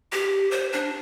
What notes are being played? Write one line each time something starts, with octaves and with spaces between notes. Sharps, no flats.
G4
C5
D4